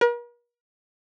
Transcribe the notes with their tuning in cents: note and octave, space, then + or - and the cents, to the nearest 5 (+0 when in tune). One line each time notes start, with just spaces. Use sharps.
A#4 +45